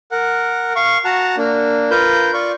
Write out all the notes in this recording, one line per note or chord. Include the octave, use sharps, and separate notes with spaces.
A#4 F#5
F5 C#6
F#4 F#5 A5 A#5
A#3 D4
F4 A#4 B4 G6
F4 D5 C#6